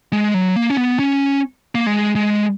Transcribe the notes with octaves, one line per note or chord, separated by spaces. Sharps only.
G#3
F#3
A#3
C#4
B3
C#4
A#3
G#3
G#3